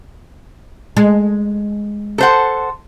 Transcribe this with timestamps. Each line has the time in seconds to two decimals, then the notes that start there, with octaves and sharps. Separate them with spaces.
0.97 G#3
2.18 A4 C5 F#5